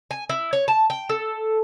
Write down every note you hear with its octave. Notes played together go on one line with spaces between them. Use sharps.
G#5
E4
C#5
A5
G5
A4